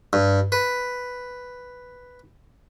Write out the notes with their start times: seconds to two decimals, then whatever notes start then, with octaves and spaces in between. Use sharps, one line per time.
0.13 G2
0.52 B4